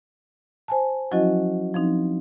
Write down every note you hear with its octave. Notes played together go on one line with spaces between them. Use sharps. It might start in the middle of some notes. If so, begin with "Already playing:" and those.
C5 G#5 A5
F3 F#3 C#4 E4 F#4 D#5
F3 C4 D#4